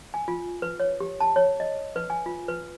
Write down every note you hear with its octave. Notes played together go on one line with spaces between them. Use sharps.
G#5
F4
B4
C#5
G4
A5
C#5
D#5
B4
G#5
F4
B4